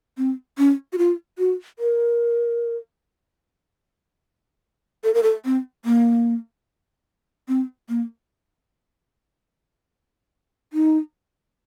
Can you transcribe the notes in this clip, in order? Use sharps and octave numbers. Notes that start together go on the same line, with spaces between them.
C4
C#4
F#4
F4
F#4
A#4
A4
A#4
A4
C4
A#3
C4
A#3
D#4